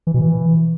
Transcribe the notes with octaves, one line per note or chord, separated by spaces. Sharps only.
E3
B2
E3